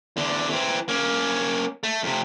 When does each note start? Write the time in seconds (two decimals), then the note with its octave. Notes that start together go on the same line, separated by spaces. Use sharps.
0.17 E2 D3
0.50 E3 C4
0.89 A#3 C#4
1.84 A3
2.03 F2 C3